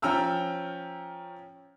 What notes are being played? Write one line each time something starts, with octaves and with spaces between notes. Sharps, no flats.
F3 C#4 G5 A#5 E6 F6